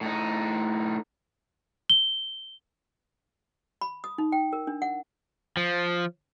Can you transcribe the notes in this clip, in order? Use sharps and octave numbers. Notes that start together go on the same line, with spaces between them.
A2 D#4
G7
B5
D#6
D#4
G5
A#4
D4
F#5
F3